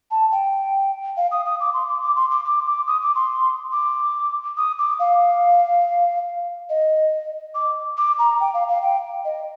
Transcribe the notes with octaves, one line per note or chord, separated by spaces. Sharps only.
A5
G5
F5
D#6
D#6
D6
C6
D6
D6
C6
D6
D6
D6
D#6
D6
C6
D6
D#6
D6
F5
D#5
D6
D6
A#5
G5
F5
F5
G5
D#5